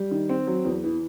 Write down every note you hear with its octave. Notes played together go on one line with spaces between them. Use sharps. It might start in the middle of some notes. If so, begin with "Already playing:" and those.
Already playing: G3
D#3
C4
F#3
E2
E3